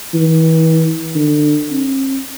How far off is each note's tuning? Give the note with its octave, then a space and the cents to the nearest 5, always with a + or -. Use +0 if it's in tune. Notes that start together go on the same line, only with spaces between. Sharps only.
E3 -35
D3 +25
C4 +45